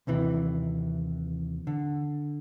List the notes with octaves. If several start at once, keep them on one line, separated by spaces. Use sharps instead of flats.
D#2 C3 E3
D3